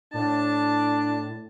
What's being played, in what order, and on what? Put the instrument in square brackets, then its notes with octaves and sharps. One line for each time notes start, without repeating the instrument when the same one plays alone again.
[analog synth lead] A2 [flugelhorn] D4 [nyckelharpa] A5